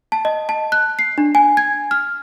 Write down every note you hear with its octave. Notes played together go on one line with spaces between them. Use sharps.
A5
D#5
A5
F#6
C7
D4
G#5
G#6
F6